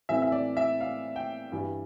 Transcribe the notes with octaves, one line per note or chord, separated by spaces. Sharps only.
A2 E3 A3 C4 E5
E5
D5
E5
F5
G5
G2 E3 G3